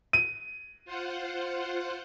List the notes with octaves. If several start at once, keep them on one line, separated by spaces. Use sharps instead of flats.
D#7
F4 C5 F#5